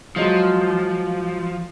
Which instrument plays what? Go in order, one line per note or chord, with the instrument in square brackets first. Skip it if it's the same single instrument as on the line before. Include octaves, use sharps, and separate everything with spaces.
[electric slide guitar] F3 [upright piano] F#3 G#3 F4